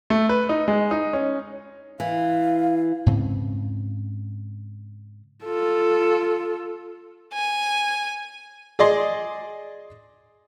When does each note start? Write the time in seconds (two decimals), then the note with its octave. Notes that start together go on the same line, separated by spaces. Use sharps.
0.10 A3
0.29 B4
0.49 D#4
0.68 G#3
0.91 D#4
1.13 C#4
2.00 E3 F5
3.06 G#2 C#3 C4
5.45 F4 A4
7.33 G#5
8.79 G#4 D5 D#5 C6